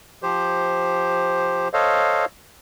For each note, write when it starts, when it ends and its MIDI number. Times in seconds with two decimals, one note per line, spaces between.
0.23 1.68 53
0.23 1.68 67
0.23 1.68 72
1.73 2.25 69
1.73 2.25 72
1.73 2.25 73
1.73 2.25 75
1.73 2.25 77